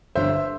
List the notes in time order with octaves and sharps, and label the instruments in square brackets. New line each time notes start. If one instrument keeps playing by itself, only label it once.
[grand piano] G1 G2 D3 C5 E5